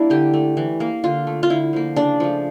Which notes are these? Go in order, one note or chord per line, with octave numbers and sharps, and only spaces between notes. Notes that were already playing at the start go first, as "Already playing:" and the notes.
Already playing: G3 A#3 D4 E4
D3 G4
A3
E3
A#3
D3 F4
A3
F4
D3 E4
F3 A#3
C#3 D4
F3 A3